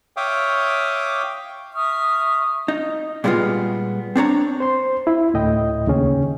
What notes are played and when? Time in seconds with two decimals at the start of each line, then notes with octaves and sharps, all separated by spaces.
0.17 C#5 E5 F5 G5 D6 D#6
1.74 E5 C#6 D#6 F6
2.68 D#4
3.24 A#2 G3 G#3 B3 C#4 F4
4.16 C4 D4 C#5 A#5
4.60 C5 C6
5.07 E4
5.34 D2 A2 D#5 G5
5.87 D#2 C#3 C#4